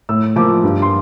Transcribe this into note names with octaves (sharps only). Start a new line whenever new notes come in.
A2 E6
F3 A#3 D6
G2
C6